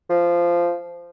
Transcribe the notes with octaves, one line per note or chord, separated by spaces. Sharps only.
F3